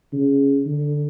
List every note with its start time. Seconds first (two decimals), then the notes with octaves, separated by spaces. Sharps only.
0.13 C#3
0.67 D3